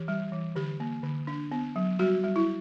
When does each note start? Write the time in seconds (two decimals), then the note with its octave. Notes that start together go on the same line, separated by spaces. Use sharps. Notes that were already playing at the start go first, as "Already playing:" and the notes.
Already playing: E3 G4
0.08 G3
0.32 E3
0.56 D3 G4
0.80 A#3
1.03 D3
1.27 D4
1.52 B3
1.76 F#3
1.99 G3 F#4
2.24 G3
2.36 E4